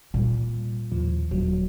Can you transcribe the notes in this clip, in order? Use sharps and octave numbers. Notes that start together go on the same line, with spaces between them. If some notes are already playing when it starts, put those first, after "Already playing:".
A#2 G3
D#2 A2 F3
D#1 F#3